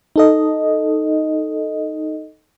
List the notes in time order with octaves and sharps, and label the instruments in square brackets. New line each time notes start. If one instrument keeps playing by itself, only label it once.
[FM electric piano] D#4 A4 D#5